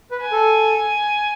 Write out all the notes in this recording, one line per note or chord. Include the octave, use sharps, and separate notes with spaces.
B4
G#5
A4